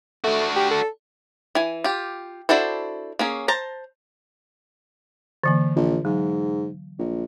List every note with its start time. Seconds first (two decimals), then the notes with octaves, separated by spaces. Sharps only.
0.24 A3 D4 F#4
0.56 G4
0.71 A4
1.55 E3 G#5
1.84 F4 G4
2.49 D4 E4 F#4 A4 C5
3.19 A#3 C#4 G#4
3.48 C5 A5 A#5
5.44 D3 E3 A#3
5.76 A#1
6.05 G#2 F#3
6.99 A#1